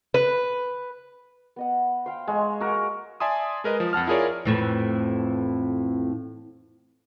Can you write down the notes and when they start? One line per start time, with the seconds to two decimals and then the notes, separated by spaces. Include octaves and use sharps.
0.14 B4
1.56 B3 D#5 F#5
2.06 C5 F5 G5
2.28 G#3 G#5 A#5 C#6
2.60 F#4 A#4
3.20 D5 E5 G#5 A5 C6 D#6
3.64 G#3 A#4 B4 D#5
3.80 F3
3.93 F2 F#5 A5 F6
4.07 E4 F4 G#4 A#4 C#5 D5
4.45 F2 A2 E3